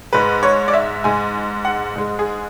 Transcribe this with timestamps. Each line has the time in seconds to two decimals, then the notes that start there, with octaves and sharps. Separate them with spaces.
0.13 G#2 G#3 B4
0.43 C#5
0.68 D5
0.74 E5
1.04 G#2 G#3 G#5
1.65 F#5
1.96 G#2 G#3
2.19 G#4